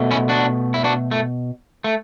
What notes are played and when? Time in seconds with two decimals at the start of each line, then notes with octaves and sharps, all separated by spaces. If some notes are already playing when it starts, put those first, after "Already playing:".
Already playing: B2 A3
0.11 C#4 E4
0.29 D4 F#4
0.74 E4
0.84 D4 F#4
1.11 A3
1.84 A3